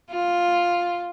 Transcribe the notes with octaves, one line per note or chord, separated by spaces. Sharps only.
F4